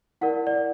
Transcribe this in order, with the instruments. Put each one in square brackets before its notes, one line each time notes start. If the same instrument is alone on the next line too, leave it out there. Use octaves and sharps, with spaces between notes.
[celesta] E4 A#4 D5 F#5
D5